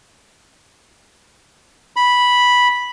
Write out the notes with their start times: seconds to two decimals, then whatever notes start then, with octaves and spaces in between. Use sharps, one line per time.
1.96 B5